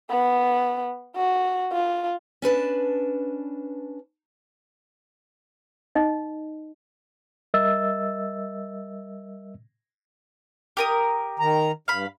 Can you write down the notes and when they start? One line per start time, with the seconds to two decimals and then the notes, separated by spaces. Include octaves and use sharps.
0.10 B3
1.16 F#4
1.72 F4
2.42 C#4 D4 B4 A5
5.95 D#4 D#5
7.54 G3 A#4 D#5 E5 E6 A6
10.77 G4 A#4 D#6
11.39 D#3 A#5
11.88 G2 F5 B5